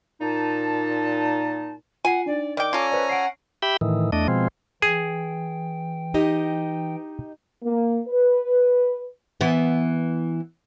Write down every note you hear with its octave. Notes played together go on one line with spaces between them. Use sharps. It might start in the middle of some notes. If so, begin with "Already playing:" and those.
A#2 D#4 A5
F4 F#5 G#5 C7
D4 D#4 D5
D#3 D5 G5 D6
C#4 F4 A4 G#5 A#5
B4 C5 D5
F#5 C7 D7
G4 E5 G5 B5
A2 D#3 E3
E2 A3 D4 D#5
B2 F3 G#3 C4
E3 G#4 G5
D#4 G4 D#5
A#3
B4
E3 B3